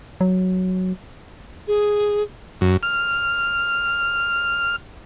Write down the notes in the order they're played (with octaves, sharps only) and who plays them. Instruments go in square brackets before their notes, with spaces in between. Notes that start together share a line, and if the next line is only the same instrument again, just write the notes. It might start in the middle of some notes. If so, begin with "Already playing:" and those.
[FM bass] F#3
[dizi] G#4
[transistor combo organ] F#2
F6